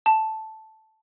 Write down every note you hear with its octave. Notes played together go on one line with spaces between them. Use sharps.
A5